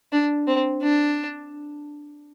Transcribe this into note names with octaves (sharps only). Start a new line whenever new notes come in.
D4
C4
D4